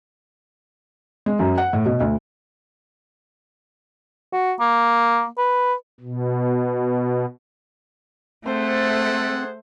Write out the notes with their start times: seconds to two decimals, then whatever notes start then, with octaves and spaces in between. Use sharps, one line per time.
1.26 G#3
1.39 F#2
1.58 F#5
1.73 A2
1.86 B2
2.00 D2
4.33 F#4
4.60 A#3
5.38 B4
6.00 B2
8.46 A3 C4 G#4 A4 C5 F#5